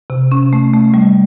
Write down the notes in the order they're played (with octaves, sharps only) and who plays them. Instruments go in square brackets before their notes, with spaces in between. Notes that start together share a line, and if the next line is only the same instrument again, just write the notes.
[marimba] C3
C#4
A3
A3
G3